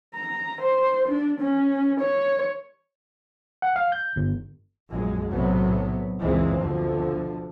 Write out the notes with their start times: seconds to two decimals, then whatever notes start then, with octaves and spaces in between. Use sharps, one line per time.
0.15 A#5
0.61 C5
1.08 D4
1.40 C#4
2.00 C#5
3.62 F#5
3.76 F5
3.92 G6
4.16 G1
4.91 A#1 F#2 G#3
5.30 B1 A2 C3 F#3 B3
6.21 F#1 C#2 A#2 E3 G#3 C4
6.62 D2 B2 D3 F3